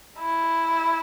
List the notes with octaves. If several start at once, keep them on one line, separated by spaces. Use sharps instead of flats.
E4